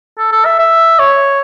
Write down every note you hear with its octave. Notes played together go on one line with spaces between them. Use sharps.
A4
A4
E5
E5
C#5